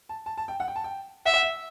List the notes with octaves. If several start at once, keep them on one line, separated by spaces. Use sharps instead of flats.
A5
A5
A5
G5
F#5
G5
A5
G5
E5 F#5
F#5
E5